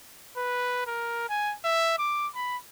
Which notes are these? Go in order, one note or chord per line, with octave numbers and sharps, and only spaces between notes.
B4
A#4
G#5
E5
D6
B5